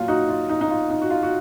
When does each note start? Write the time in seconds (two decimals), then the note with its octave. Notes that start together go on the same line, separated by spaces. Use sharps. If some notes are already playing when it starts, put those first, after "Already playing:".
Already playing: A#2 F#3 F4
0.08 D#4 F#4
0.29 F4
0.49 D#4
0.61 D#4
0.70 F4
0.91 D#4
1.02 F#4
1.10 F4
1.23 F#4